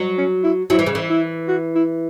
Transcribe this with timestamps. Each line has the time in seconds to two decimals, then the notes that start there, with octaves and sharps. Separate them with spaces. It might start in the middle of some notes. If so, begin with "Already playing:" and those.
Already playing: F#3
0.18 C#4
0.44 E4
0.70 F#3 E4
0.79 E3
0.87 C#3
0.95 E3
1.10 E4
1.48 F#4
1.75 E4